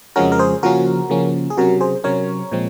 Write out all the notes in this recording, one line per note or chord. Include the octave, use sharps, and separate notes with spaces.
F2 C#3 F3 G#3 C#4 F#4 A#4
A#4
G#4 C5
C#3 F3 A#3 C#4 F#4 A#4
C#3 F3 A#3 C#4
G#4
C3 F#3 C#4 F#4 A#4
G#4 C5
C3 F#3 C#4 A#4 C#5
A#2 F3 G#3 C4